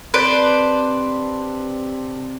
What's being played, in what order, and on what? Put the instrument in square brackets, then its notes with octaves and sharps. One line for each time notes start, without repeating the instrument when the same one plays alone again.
[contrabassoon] C3 [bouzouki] D4 [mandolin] B4 C5 D5